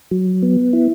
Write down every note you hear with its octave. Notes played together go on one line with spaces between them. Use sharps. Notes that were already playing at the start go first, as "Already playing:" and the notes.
F#3
B3
E4